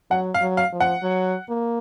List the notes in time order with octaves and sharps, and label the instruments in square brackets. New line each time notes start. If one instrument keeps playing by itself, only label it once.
[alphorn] F#3 [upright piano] F#5
[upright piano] F5
[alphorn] F#3
[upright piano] F5
[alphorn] F3
[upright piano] F#5
[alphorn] F#3
A#3